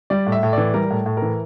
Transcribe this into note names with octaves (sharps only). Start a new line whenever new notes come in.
G3 D5
A2
E5
A2
E3 D5
G3 A#4
A2
A2
A#4
E3